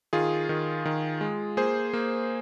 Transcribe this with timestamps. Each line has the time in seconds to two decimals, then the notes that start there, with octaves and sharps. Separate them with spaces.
0.13 D#3 F4 G#4
0.49 D#3
0.85 D#3
1.21 G#3
1.57 A#3 G#4 C5
1.93 A#3